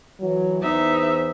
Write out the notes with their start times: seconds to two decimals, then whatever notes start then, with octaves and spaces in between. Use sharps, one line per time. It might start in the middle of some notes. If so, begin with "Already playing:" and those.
0.21 E3 F#3
0.62 E2 D#4 C5 E5